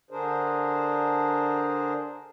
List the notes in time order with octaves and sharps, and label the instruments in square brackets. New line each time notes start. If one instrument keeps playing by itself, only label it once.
[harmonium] D3 D4 G#4 A#4 C5